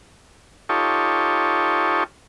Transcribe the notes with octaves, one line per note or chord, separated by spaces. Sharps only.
D#4 F4 G4 A4 C#5